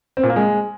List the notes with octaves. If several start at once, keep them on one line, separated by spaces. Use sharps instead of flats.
C4
A#2
A#3
G#3